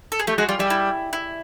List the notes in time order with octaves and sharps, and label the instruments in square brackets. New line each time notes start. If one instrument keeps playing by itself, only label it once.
[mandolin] A4
G#4
[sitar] A3 [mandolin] G4
[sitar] G#3 [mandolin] F#4
[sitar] G3 [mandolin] F4
[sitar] G3 [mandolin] E4
[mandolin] E4
E4